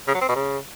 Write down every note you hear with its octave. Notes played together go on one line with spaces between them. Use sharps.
C#3
F#3
C4
B2
C#3